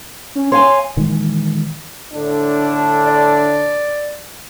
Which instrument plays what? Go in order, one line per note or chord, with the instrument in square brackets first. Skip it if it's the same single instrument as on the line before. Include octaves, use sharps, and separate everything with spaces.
[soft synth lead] C#4
[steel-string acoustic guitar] C#5 F5 G#5 [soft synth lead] C6
[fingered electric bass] A#2 D#3 E3 G#3
[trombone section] A2 D3 D4
[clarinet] D5